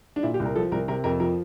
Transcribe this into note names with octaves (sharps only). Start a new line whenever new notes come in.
D4
A#2 E4
G4
C2
A#4
F3 A4
C2 A#4
C3 A#4
F2 A#4
F3 A#4